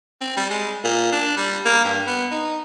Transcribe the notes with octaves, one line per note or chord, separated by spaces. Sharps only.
C4
G3
G#3
A#2
D4
G3
A#3
G2
B3
D#4